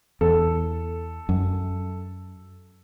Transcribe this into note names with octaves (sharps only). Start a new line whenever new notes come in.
E2 A4
F#2